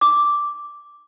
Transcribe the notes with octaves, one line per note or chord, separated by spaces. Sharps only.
D6